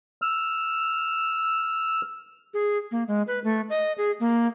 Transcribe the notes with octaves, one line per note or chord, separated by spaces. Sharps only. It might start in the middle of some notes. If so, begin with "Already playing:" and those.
E6 F6
G#4
A#3
G#3
B4
A3
D#5
G#4
A#3